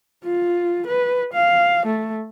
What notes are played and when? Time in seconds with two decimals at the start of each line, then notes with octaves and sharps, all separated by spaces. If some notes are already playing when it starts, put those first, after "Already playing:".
0.24 F4
0.87 B4
1.33 F5
1.86 A3